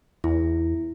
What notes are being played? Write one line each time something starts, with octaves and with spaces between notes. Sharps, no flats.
E2 E4